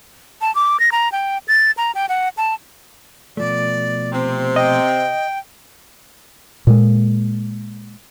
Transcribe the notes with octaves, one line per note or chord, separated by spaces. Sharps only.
A5
D6
A#6
A#5
G5
A6
A#5
G5
F#5
A5
B2 F3 A3 D5
C3 C4
D#5 G5
A#2 G#3